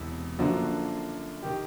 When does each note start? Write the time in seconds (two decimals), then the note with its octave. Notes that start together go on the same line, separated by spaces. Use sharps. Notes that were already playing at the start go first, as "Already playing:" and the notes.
Already playing: E1 E2 C3
0.38 F#2 D3 F3 A#3 D4 F#4
1.42 D#3 G4